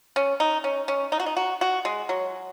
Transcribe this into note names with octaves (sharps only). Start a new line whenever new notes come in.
C#4
D#4
C#4
C#4
D#4
F#4
D#4
F#4
F#4
G#3
F#3